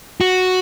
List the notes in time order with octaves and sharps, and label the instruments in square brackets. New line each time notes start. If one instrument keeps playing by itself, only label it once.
[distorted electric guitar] F#4